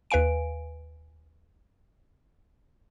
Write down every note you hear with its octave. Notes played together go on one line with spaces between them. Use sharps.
D#2 B4 F5 G#5 D7